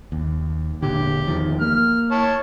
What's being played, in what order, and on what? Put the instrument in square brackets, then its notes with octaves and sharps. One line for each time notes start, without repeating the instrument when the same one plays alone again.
[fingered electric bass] D#2
[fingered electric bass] E1 A#2 D3 [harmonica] G4
[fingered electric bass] E2 D#3 F3
[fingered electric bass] A#3 [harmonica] F6
[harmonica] C#5 A5